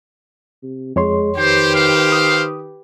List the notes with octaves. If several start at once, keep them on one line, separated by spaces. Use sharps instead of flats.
C3
F2 G#3 C#5 C6
D#3 G4 B4 C5
C5 F5
D#6